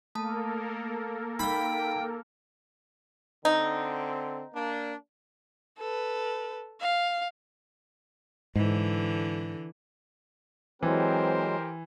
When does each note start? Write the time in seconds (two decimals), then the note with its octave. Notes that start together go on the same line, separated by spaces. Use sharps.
0.15 A3 A#3 A4 A#4 A5 D#6
1.39 D#4 F5 G5 B5
3.45 D3 C4 D#4
4.54 A#3 D4
5.79 A4 B4
6.81 F5
8.56 G#2 D3 E3
10.83 E3 F#3 G#3 C4 G4 A#4 C5